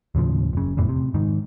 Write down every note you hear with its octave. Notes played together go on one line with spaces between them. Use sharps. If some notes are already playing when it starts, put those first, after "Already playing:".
D#2 A2 C#3 F3
F#1 C#3
F#1 E2 A2 E3
C3
G#2 D#3